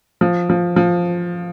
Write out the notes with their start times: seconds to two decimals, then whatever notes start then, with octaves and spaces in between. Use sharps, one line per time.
0.21 F3
0.50 F3
0.76 F3